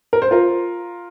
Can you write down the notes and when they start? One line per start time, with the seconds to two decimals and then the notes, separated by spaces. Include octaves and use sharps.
0.13 A#4
0.22 C5
0.31 F4 A#4